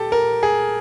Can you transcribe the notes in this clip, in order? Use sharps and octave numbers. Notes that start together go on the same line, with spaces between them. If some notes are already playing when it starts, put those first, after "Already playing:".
Already playing: G4 A4
A#4
G#4